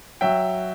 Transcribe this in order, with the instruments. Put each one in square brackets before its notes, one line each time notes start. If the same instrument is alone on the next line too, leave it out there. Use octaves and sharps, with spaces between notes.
[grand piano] F#3 E5 G5